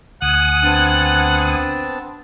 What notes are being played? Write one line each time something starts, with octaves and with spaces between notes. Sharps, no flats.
D2 F#5 G#5 D#6
B3 C4 D4 A5